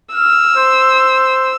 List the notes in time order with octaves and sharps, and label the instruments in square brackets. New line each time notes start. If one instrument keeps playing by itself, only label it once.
[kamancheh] E6 [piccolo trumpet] F6
[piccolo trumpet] C5